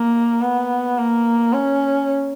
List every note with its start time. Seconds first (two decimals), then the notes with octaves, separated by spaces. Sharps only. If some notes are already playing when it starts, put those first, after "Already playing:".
Already playing: A#3
0.42 B3
0.98 A#3
1.53 C#4